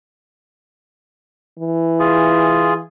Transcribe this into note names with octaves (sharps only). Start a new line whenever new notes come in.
E3
F4 G#4